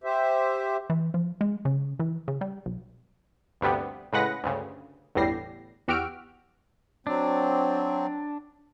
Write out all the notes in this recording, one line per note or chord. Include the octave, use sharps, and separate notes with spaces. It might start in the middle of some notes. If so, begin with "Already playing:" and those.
G4 C5 E5
E3
F3
G#3
C#3
E3
C#3
G3
B1
D2 G2 C3 G3 B3
A2 C#3 G#3 B4 F#5 A#6
D2 G2 C#3
G1 E2 A2 G3 A#6 C7
E2 F#4 G4 E6 F6 D7
F#3 C4 D4